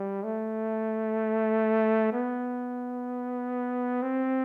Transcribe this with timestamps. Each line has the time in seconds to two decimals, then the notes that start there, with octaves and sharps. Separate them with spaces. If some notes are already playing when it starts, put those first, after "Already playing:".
Already playing: G3
0.23 A3
2.13 B3
4.02 C4